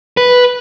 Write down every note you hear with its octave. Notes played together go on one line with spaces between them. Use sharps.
B4